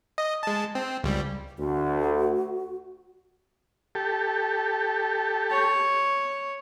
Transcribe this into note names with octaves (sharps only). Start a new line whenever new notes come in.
D#5
G#3 A5
C4
C#2 G3
D2 F#4
G4 A4
C#5